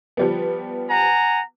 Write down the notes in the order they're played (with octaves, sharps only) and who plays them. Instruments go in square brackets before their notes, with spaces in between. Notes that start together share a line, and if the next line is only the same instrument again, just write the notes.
[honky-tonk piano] F3 G3 B3
[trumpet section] F#5 G#5 A#5